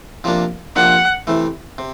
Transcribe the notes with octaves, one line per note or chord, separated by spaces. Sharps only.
C3 F3 A#3 D4
C3 F3 A#3 D4 F#5
C3 E3 A3
C3